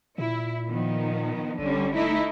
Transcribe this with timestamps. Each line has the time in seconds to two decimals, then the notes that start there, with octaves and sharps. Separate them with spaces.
0.18 A#2 E4
0.68 D#3 F3 B3
1.59 G1 D3 G3 C#4
1.95 A3 D#4 E4